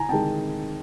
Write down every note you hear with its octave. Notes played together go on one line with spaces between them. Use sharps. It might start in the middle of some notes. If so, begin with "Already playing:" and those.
Already playing: G#5 A#5
C3 D#3 G#3 G5 A5